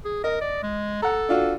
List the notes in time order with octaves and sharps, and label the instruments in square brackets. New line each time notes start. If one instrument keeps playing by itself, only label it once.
[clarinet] G#4
[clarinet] A#4 [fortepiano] D#5
[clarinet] D5
G#3
[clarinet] A4 [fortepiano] F#5 A#5
[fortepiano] D4 F4 F#4